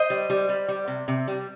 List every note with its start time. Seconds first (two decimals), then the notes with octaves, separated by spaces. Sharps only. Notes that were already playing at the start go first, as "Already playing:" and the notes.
Already playing: C5 D#5
0.10 G3
0.30 G3
0.49 G3
0.68 G3
0.88 C3
1.08 C3
1.28 G3